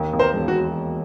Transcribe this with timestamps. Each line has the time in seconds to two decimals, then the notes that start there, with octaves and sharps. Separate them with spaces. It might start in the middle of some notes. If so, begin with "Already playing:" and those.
Already playing: D#2
0.13 D#2
0.19 A#4 C5
0.34 E1
0.48 F#4